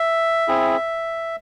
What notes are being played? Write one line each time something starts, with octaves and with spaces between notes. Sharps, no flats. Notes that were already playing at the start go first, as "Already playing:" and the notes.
Already playing: E5
C4 E4 G#4